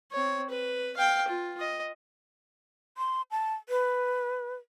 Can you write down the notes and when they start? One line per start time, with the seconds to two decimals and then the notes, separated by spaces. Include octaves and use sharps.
0.11 C4 C#5
0.50 B4
0.96 F5 G5
1.28 F4
1.60 D#5
2.98 C6
3.31 A5
3.69 B4